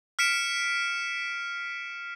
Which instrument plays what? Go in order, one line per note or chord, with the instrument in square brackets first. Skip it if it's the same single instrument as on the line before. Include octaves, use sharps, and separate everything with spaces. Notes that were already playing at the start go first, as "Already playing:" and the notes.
[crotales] F6 B6 C#7 D7 E7